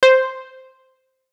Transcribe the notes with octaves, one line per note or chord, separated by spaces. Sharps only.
C5